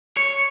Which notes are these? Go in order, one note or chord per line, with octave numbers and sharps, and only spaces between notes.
C#5